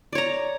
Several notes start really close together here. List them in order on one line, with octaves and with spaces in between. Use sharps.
D5 C#5 A#5